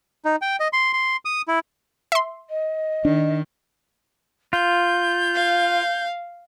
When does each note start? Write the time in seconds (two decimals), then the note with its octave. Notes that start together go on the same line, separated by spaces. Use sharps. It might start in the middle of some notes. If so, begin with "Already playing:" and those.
0.25 D#4
0.42 G5
0.60 D#5
0.73 C6
0.93 C6
1.25 D#6
1.48 E4
2.12 E5 C6
2.49 D#5
3.05 D#3 D4
4.53 F4 G6
5.34 F5